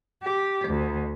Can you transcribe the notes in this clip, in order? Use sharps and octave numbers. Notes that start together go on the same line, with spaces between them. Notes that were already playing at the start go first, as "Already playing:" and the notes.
G4
D2